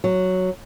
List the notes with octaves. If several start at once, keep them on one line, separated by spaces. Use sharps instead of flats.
F#3